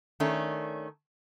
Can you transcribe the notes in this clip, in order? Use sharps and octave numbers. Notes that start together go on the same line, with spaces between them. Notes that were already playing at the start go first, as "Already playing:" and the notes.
D#3 A3 C#4 D4